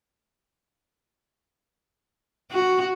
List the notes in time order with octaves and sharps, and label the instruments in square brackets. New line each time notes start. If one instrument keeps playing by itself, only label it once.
[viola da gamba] F#4